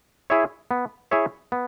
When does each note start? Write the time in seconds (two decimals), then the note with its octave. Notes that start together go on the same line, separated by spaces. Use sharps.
0.30 E4 G#4 C#5 E5
0.71 B3
1.11 E4 G#4 C#5 E5
1.52 B3